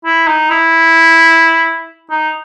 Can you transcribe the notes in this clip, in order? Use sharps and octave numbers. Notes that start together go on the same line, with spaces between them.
E4
D#4
E4
D#4